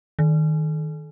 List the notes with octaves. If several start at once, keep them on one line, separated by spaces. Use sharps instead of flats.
D#3